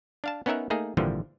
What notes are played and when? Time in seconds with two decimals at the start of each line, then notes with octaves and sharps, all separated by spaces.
0.24 D4 F5 A5
0.46 B3 C#4 D#4 A#4 E5 F#5
0.70 A3 A#3 D#4 G#4
0.97 G#1 A#2 D3 E3 F3 G3